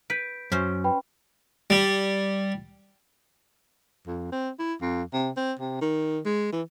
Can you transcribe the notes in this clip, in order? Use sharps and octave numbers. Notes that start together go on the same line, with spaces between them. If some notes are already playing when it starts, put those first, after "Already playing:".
B4 G6 B6 D7
F#2 C#4 C5
B4 G5 B5
G3
F2
C4
E4
F2
C3
C4
C3
D#3
G#3
E3